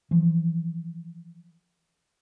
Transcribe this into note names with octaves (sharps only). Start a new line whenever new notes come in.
E3 F3